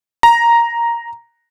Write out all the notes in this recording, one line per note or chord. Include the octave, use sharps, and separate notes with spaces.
A#5